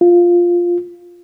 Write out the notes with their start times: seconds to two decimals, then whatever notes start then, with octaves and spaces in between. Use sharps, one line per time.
0.01 F4